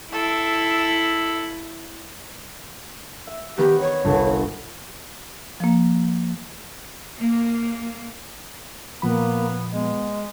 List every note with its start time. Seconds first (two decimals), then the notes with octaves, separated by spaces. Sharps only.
0.12 E4 A4
3.27 E5
3.58 D#3 B3 D#4 G4
3.80 C#5
4.04 G1 C2
5.60 F3 A#3
7.18 A#3
9.02 A#2 F3 A#3 B3 B5
9.73 G#3 B3